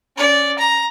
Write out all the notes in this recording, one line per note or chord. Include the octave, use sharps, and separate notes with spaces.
C#4 D5
A#5